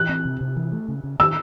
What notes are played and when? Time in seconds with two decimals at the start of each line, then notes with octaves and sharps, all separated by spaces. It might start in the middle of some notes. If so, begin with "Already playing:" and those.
Already playing: E3 F#6
0.09 C4
0.25 C3
0.41 C3
0.56 E3
0.72 A3
0.88 C#3
1.04 C#3
1.19 D#3 E6